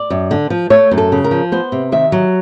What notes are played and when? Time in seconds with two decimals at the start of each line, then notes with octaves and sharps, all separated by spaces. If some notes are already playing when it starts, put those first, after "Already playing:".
Already playing: D5
0.10 F#2
0.31 D3
0.50 F3
0.70 A3 C#5
0.91 F#2
0.98 A4
1.12 C#3
1.24 A#4
1.31 F3
1.52 B3 C5
1.72 C3
1.92 D#3 E5
2.12 F#3